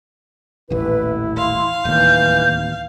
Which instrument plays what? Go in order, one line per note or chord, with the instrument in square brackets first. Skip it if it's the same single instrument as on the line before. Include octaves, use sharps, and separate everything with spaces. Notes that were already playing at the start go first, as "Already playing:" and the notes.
[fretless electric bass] D#1 A1 [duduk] E4 [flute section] B4
[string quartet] F5 [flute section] C6
[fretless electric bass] D1 D#2 [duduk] E3 [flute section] G6